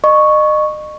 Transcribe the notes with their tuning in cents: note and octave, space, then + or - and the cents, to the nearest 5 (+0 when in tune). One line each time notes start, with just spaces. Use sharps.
D#5 -35 C#6 +0